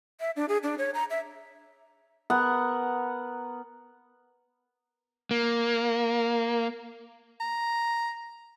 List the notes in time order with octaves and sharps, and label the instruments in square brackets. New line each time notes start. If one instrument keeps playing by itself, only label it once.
[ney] E5
D4
G#4
D4
C#5
A#5
E5
[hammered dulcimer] B3 A#4 F#5
[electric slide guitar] A#3
[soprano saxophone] A#5